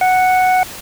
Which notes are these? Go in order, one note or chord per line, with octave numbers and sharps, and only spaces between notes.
F#5